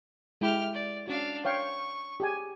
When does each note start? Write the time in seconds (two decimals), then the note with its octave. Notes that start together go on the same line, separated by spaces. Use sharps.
0.41 G#3 E4 G4 B5 F6
0.74 D5
1.07 C#4 D4 F#4 F5
1.45 C#5 F5 G5 C#6
2.20 G4 G#4 G#5